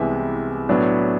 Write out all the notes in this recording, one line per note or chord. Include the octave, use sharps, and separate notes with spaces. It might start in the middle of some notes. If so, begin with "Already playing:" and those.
Already playing: C2 C3 E3 G#3 B3 E5
A2 F#3 B3 D4